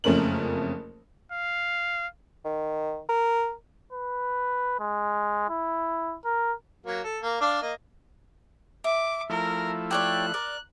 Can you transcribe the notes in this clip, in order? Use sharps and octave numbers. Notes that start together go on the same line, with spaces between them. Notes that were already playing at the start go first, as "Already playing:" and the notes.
F#1 F2 A3 C#4 A#4 F#7
F5
D#3
A#4
B4
G#3
E4
A#4
F#3 A#3
A4
A#3
D4 D5 F5
A#3 D#5
E5 D6
F3 A3 E4 A#4
G4 C#5 D5 F#6
A#4 D5